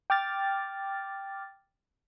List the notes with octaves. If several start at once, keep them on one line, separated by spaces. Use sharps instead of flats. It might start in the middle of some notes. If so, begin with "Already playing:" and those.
G5 D6 F6 A6